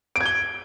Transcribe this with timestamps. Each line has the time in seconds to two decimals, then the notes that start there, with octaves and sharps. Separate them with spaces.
0.16 D7
0.21 G#6
0.26 G7